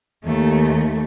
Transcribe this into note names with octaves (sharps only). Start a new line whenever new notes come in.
D#2 A3